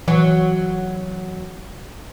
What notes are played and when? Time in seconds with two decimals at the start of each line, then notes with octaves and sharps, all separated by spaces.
0.08 E3 F#3